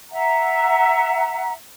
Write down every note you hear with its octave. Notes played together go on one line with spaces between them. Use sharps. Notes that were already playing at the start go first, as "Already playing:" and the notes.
E5 F#5 A#5